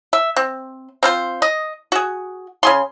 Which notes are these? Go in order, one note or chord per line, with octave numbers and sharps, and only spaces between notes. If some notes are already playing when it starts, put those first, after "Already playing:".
E5
C4
C4 F4 C5
D#5
F#4 G#4
C#3 G#4 C6